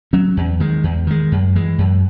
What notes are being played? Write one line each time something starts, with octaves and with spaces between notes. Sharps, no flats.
F#3 C#4
E2
D#3 G#3
E2
D#3 G#3
F#2
E3 G#3
F#2